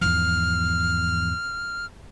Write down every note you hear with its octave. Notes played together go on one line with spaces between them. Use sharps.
E2 G#2 F3 F6